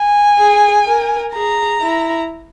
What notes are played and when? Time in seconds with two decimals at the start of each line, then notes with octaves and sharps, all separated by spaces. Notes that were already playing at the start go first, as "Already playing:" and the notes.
Already playing: G#5
0.39 G#4
0.86 A#4
1.34 G#4 A#5
1.81 E4